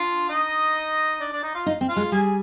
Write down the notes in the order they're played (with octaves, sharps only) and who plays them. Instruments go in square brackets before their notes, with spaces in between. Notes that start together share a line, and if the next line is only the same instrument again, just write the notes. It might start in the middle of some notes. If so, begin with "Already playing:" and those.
Already playing: [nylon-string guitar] D4 [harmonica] F4 F5
[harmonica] D#4 D#5
D4 D5
D4 D5
D#4 D#5
F4 F5
[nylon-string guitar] D#4
C4
[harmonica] F4 F5
[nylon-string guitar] G#3
[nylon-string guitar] G3 [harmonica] G#4 G#5